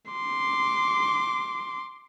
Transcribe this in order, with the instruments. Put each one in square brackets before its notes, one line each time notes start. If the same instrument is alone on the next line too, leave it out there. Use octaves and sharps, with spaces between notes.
[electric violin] C6 D6